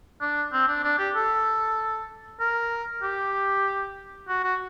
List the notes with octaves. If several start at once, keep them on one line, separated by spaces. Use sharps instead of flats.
D4
C4
D4
D4
G4
A4
A#4
G4
F#4
F#4